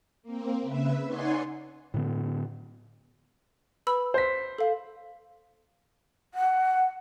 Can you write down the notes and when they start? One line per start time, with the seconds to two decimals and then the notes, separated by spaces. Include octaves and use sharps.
0.22 A#3 C4
0.62 C#3 B4 E5
1.06 D#4 C#5 D5 F#5 G#5 C6
1.94 A2 D3 B3
3.87 B4 B5 E6
4.14 C5 B6
4.58 A4 F5
6.34 F#5